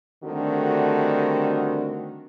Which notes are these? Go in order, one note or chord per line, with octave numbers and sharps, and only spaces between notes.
D3 D#3 G3 A3 C4 F#4